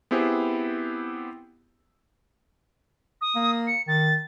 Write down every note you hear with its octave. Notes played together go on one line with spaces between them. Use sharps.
B3 C4 E4 G4 G#4 C5
D#6
A#3
C#7
D#3 A6